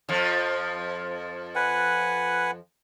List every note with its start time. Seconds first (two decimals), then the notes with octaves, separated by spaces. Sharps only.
0.09 F2 F3
1.55 B4 F#5 G#5